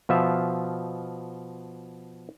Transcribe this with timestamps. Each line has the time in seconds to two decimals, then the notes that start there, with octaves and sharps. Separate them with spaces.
0.09 B2 F3 F4 E5